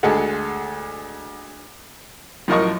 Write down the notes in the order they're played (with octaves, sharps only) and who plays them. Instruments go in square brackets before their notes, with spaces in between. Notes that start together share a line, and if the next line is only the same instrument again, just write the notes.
[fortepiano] D2 G#3 G#4 A4 F#5
F#2 A2 F3 A#4 D#5 C#6